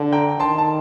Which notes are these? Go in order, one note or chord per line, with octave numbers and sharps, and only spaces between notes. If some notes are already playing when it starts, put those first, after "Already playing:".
Already playing: D3
G5 A#5
D#3 A5 C6
A5